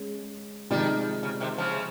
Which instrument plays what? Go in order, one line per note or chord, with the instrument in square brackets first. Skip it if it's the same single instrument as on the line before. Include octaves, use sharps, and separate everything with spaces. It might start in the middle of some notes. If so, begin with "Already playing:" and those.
Already playing: [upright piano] G#3 C#4
[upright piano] C3 F3 G#3 D#4 G#4 [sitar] D#3 G3
[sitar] C#3
C3 D#3
C#3 F3